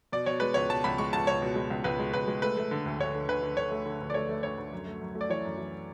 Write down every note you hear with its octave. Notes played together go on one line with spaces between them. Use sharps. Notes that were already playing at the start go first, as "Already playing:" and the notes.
B2 D5
B2 C#5
G#3 B4
C#2 C#5
B2 A5
C#2 B5
G#3 C#6
C#2 A5
C#2 C#5
B2
G#3
C#2
C#2 B4
G#3
C#2 B4
G#3
A3 B4
A3
D3
D2
D2 C#5
D3
D2 B4
D3
D3 C#5
A3
D3
D2
D5
A3 C#5
A3
D2 C#5
D2
F#2
A3
F#2
A3
D5
E3 C#5
F#2
E3